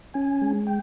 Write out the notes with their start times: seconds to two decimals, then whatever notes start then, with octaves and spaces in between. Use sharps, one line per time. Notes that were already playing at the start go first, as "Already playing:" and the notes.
0.14 C#4 G#5
0.42 G#3
0.67 G5